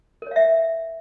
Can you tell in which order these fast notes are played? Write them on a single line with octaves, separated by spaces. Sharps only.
A#4 C#5 F5 E5